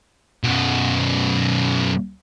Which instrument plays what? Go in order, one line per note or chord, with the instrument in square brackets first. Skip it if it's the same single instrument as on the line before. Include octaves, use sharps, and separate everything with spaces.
[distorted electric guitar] F#2 B2